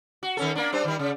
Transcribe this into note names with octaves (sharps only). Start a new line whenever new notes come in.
F#4
D#3 C#4 A4
A#3 D4
G3 D4 C5
D#3 G3
C#3